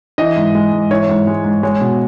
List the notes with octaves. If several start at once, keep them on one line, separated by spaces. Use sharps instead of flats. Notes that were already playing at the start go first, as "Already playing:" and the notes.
E3 D#5
G#2
G#3
G#2
E3 C#5
G#2
G#3
G#2
G#3 C#5
B2